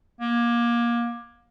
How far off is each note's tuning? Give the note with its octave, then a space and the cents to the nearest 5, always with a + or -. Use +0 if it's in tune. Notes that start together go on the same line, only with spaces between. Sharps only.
A#3 +25